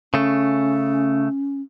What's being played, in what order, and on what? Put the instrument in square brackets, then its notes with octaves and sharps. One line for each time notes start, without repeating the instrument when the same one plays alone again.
[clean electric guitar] C#3 A3 [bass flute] C#4